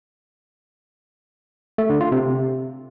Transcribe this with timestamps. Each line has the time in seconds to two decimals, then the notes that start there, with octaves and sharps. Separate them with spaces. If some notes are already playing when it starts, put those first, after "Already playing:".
1.78 A3
1.90 D3
2.01 F4
2.12 C3